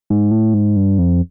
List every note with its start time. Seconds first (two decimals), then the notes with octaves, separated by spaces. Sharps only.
0.10 G#2
0.31 A2
0.54 G#2
0.76 G2
0.98 F2